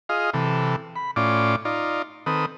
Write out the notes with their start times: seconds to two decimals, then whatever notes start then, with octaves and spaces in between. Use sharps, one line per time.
0.09 F4 G#4 D#5 F5
0.34 C3 E3 A4
0.96 B5
1.16 A2 C#4 F4 D5 D6
1.65 D#4 F4 D5
2.26 D#3 C4 A4 B4 D#6